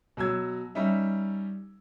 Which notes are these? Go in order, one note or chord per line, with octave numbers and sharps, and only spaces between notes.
B2 F#3 E6 G#6
G3 C#4 D#4 E5